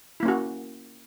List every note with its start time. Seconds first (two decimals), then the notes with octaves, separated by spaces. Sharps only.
0.20 E4
0.23 A#3
0.25 C#4
0.28 F#4